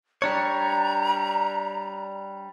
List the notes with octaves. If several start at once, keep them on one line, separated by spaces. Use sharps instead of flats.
G3 D4 C#5 A#5